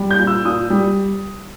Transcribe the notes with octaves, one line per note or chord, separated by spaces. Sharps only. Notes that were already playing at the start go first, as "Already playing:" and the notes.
Already playing: G3
G6
A#2
E6
A#2 D#6
G3